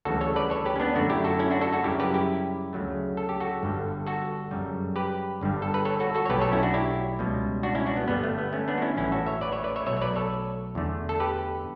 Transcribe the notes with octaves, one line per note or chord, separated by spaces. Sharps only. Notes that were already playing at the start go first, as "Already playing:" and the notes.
D2 C#3 E3 G3 F#4 A4
A4 C#5
B4 D5
A4 C#5
G4 B4
C#4
B3 D4
F#2 D3 A3 D4 F#4
E4 G4
F#4 A4
C#4 E4
D4 F#4
F#4 A4
F#4 A4
F#2 C#3 G3 E4 G4
G4 B4
E4 G4
D2 C#3 F#3 A3
A4
G4
F#4 A4
G1 G2 D3 G3
F#4 A4
F#2 C#3 G3
G4 B4
G1 G2 D3 G3
A4
B4
A4 C#5
F#4 A4
F#4 A4
C#5
B1 B2 A3 G4 B4
A4 C#5
C#4 E4
D4 F#4
E4 G4
C#2 B2 G3
D4 F#4
C#4 E4
D4 F#4
B3
G1 G2 D3 G3 B3
A3
B3
A3 C#4
B3 D4
F#4
C#4 E4
A1 A2 E3 C#4 E4
F#4 A4
C#5 E5
B4 D5
C#5 E5
B4 D5
C#5 E5
B1 B2 F#3 A3 C#5 E5
C#5
B4 D5
A4 C#5
E2 D3 A3
A4
G4 B4